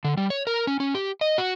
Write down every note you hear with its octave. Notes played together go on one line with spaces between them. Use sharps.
D3
G3
C#5
A#4
C#4
C#4
G4
D#5
F#4